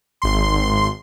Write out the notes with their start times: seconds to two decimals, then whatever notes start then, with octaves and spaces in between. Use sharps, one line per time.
0.22 G#1 C6